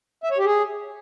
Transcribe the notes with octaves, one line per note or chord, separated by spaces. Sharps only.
E5
C#5
G4
G#4